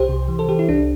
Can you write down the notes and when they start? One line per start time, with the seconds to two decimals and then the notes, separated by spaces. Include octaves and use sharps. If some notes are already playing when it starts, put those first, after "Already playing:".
Already playing: C2 G4 C5
0.09 C3
0.28 E3
0.39 A4
0.49 E3 G4
0.59 E4
0.69 C2 D4